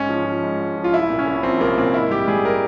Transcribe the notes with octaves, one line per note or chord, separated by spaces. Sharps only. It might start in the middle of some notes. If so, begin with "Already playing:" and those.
Already playing: G#2 C#4
F3
F3
G#2
G#2
F3
F4
C2 E4
A#2
C#4
C2
F3 C4
C2 A#3
A#2 C4
G#2 E4
G3 G4
G3 G#4
A#4